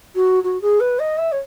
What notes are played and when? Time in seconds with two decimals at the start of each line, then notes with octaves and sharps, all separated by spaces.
0.15 F#4
0.43 F#4
0.61 G#4
0.80 B4
0.99 D#5
1.17 E5
1.31 C#5